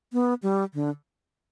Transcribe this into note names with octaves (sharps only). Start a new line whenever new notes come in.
B3
G3
D3